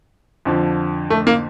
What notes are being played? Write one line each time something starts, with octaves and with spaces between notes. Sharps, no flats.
F2 D3 F3
A3
A#3